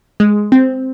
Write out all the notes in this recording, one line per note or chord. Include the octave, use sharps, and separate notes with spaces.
G#3
C4